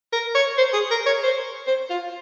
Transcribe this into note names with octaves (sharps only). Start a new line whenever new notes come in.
A#4
C#5
C5
G#4
A#4
C#5
C5
C5
F4